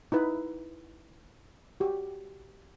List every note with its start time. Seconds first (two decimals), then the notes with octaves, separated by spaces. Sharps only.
0.12 D#4 E4 B4
1.80 F#4 G4